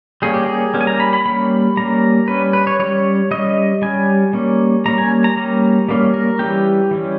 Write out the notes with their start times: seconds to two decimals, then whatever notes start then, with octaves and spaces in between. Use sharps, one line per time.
0.22 G3 A#3 C#4 G#4
0.34 G4
0.46 G#4
0.74 G3 A#3 C#4
0.81 G#5
0.87 A#5
1.00 B5
1.13 B5
1.26 G3 A#3 C#4 B5
1.77 G3 A#3 C#4 A#5
2.28 G3 C#4 B4
2.53 B4
2.67 C#5
2.79 G3 C#4 C#5
3.31 G3 C#4 D#5
3.82 G3 C#4 G#5
4.33 G3 A#3 C#4
4.86 G3 A#3 C#4 A#5
4.98 G#5
5.24 A#5
5.37 G3 A#3 C#4
5.89 G3 A#3 C#4
6.14 A#4
6.39 E3 G3 C#4 G4
6.91 E3 G3 C#4